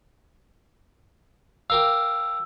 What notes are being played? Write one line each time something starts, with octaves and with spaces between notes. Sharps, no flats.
G4 A#4 F5 E6